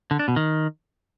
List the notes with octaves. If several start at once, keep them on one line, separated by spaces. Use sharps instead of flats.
D3
D4
B2
D#3